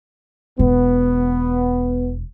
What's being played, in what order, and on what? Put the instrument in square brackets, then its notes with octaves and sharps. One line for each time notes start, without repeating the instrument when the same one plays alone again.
[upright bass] E1 [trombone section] B3